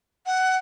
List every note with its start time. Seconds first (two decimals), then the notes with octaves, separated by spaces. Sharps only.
0.26 F#5